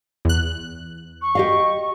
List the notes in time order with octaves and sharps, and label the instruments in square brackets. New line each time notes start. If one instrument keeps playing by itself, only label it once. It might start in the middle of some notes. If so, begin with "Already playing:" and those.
[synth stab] E2 F#6
[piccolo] C#6
[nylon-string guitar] G4 D#5 F5